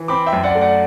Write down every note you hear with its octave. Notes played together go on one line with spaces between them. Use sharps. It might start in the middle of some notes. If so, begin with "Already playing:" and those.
Already playing: E3
C4 B5 D6
E5 G5
F#2
D5 F#5
A3
D5 F#5